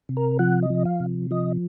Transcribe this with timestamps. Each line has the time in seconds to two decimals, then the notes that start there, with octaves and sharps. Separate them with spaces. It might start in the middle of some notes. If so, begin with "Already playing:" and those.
0.09 C3
0.17 A#4
0.39 F3 F#5
0.62 D#5
0.70 F3
0.85 F5
1.00 C3
1.31 F3 D#5